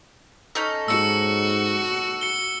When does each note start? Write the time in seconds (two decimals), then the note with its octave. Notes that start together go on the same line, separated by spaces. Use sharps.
0.55 C#4 D#4 A4
0.88 G#2 F#4 E6 C#7
2.21 C#7 G7